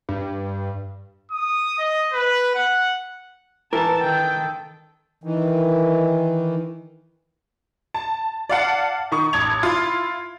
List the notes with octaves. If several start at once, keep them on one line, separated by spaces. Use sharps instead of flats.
G2
D#6
D#5
B4
F#5
E3 A#4 A5
D#3 A4 G5
D#3 E3
A5
D5 F5 F#5 A5
D#3 C#6 D#6
A1 A5 G#6 F7
E4 F4